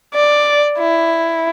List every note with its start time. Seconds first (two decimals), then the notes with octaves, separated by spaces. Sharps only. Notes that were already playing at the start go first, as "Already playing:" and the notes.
0.14 D5
0.78 E4